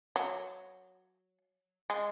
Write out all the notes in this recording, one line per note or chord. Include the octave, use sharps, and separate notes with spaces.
F#3
G#3